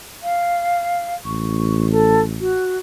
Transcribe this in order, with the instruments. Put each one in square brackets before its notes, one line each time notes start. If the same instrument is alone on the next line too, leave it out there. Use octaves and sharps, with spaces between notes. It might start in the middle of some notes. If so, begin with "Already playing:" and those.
[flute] F5
[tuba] A1 [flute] C#6
[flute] A4
F#4